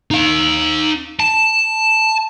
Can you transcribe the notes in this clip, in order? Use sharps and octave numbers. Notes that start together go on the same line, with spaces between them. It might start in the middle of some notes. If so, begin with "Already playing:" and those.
D#4 F5
A5